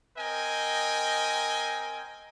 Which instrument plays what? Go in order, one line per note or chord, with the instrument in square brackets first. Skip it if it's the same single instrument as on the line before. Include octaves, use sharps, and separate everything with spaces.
[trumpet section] C4 A#4 D#5 G5 G#5